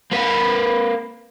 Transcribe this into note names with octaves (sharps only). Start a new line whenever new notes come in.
A#3 B4